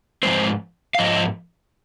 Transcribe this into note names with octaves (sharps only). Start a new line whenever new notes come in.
G#2 F3 G#3 C4 C5
F5
G#2 F3 D#5